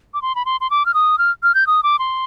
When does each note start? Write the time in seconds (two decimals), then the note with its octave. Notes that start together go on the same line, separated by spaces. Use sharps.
0.14 D6
0.22 C6
0.35 B5
0.45 C6
0.61 C6
0.71 D6
0.86 F6
0.94 D#6
1.18 F6
1.43 F6
1.55 G6
1.67 D#6
1.83 D6
1.99 C6